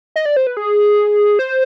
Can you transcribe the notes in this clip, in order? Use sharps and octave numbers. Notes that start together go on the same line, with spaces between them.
D#5
D5
C5
B4
G#4
C5